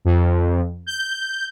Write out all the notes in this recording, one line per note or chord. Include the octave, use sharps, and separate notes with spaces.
F2
G6